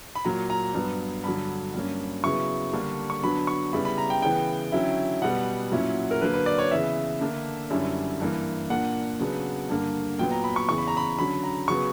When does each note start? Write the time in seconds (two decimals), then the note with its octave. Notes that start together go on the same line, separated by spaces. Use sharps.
0.15 B5
0.25 A#2 F#3 A#3 A#5
0.50 A#5
0.74 G2 F#3 B3
1.24 G2 D3 F#3 B5
1.74 G2 F#3 A#3 C#4
2.24 C#3 F#3 B3 E4 C#6
2.73 D3 G3 A#3 D4
3.10 C#6
3.23 D3 F#3 B3 D4 B5
3.47 C#6
3.73 C#3 G3 B3 E4 B5
3.85 B5
3.98 A#5
4.10 G5
4.22 C#3 E3 B3 G5
4.72 D3 F#3 C#4 E4
5.22 B2 G3 B3 F#5
5.72 A#2 F#3 C#4 E4
6.11 A#4
6.21 D3 F#3 A#3 B4
6.34 B4
6.46 D5
6.58 C#5
6.71 C#3 E3 B3 E5
7.21 D3 A#3 D4
7.70 F#2 D3 G3 C#4 E4
8.20 G2 E3 A#3
8.70 A#2 A#3 D4 F#5
9.19 C#3 F#3 B3 D4
9.69 G2 D3 A#3
10.19 A#2 F#3 B3 G5
10.31 A#5
10.44 B5
10.56 C#6
10.68 E2 C#3 E3 C#6
10.78 B5
10.88 A#5
10.97 B5
11.18 D3 F#3 C#4 B5
11.44 A#5
11.68 C#3 F#3 B3 C#6